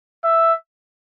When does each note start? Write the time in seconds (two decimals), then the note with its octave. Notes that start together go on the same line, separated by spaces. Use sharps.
0.24 E5